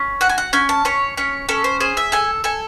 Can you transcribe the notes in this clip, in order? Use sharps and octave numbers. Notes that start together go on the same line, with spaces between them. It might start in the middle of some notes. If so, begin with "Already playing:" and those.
Already playing: C#4
F#4 F#5
G#5
F#5
C#4 G#5
A5
C#4 C#5
C#4 C#5
C#4 A4
C5
G#4 C5
E5
A4 G#5
A4 G#5